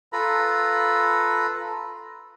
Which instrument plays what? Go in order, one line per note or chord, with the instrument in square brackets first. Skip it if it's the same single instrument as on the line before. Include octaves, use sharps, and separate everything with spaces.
[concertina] F4 A4 B4 A#5 B5